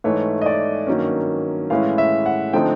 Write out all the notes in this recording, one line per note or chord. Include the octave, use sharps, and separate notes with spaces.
G#2 E3 A3 C#5
D#5
D5
G2 D#3 F#3 A#3 C#4
A2 E3 G#3 C#4 E4 F5
E5
F#5
D3 F3 A3 C4 D#4 G5